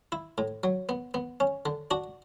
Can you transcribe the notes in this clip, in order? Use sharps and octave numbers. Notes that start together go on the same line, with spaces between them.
E4
A2
F#3
B3
B3
C#4
D3
D4 F#4